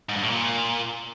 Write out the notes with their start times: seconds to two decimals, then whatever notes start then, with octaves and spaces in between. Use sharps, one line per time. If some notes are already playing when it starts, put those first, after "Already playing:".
0.09 G#2
0.16 G2
0.23 A2
0.30 A#2